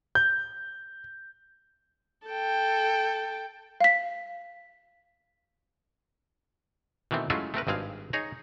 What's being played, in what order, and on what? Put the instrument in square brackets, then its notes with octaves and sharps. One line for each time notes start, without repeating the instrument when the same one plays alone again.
[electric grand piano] G6
[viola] A4 G5
[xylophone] F5 B6
[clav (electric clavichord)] B2 D#3 E3 A3 C4
F#3 G#3 A3 C#4 E4 F4
A3 C4 A#4 B4
G#1 G2 C4 G#4 F5
D#4 G#4 C#5 A#5